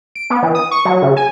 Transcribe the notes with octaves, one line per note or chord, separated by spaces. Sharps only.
D7
B3
E3
D#6
C#6
F#3
C#3
G#5